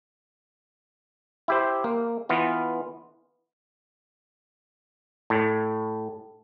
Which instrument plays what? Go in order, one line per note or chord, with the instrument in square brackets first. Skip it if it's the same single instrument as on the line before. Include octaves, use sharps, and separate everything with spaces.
[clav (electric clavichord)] E4 G4 C5
A#3
E3 B3 F4
A2